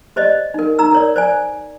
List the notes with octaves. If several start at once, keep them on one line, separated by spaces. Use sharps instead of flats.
G4 C5 D5 D#5
D#4 A#4
D#4 A#5 E6
A#4 C#5 D5
C5 D5 G#5